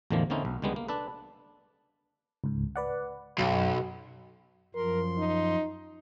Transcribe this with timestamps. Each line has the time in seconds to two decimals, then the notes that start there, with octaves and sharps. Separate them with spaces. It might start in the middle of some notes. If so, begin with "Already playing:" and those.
0.10 A1 E2 D3 D#3 F3 A#3
0.30 D3 A#3 C4 C#4 D#4 E4
0.45 B1
0.62 C#2 D3 G3 G#3 B3
0.76 A#3
0.88 D4 A4 B4
2.44 C#2 G#2
2.76 B4 D5 F#5
3.38 B1 F#2 F#3
4.75 F#2 F3 A#4 C6
5.18 D#4